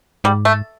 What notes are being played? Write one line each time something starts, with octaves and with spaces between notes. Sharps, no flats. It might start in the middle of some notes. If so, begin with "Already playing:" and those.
G#2 G3
A3